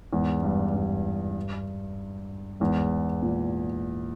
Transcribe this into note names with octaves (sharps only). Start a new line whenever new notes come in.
E2 G#2
G2
G2
E2 G#2
A#2